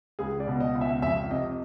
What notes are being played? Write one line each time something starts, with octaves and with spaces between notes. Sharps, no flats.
C#2 G#4
D5
B2
D#5
C#2
E5
F2 E5
C3 D#5